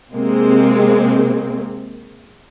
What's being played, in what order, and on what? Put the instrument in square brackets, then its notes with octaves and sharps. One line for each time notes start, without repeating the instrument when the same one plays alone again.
[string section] C3 G#3 A#3 C4